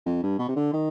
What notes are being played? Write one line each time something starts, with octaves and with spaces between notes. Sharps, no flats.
F2
G2
B2
C3
D3
D#3